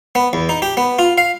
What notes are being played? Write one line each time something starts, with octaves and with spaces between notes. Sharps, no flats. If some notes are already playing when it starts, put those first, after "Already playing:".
B3
E2
D#4
G4
B3
F4
F5